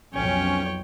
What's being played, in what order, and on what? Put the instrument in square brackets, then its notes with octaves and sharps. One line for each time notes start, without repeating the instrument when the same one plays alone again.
[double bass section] B1 F2 [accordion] C#4 [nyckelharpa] C#5 G5